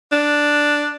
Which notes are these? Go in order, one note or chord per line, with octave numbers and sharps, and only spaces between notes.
D4